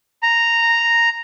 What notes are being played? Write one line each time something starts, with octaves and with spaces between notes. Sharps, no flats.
A#5